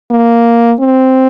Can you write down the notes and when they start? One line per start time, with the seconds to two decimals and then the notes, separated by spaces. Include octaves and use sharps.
0.11 A#3
0.80 C4